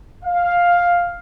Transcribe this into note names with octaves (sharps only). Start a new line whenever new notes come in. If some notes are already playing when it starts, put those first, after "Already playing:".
F5